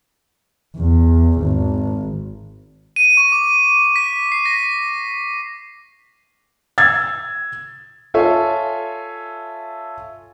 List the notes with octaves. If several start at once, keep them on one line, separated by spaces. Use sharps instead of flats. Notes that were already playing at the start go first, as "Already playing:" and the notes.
E2
G#1
D#7
C#6
D6
B6
C7
A#6
E6 G#6 A6
F4 A4 C#5 E5 G#5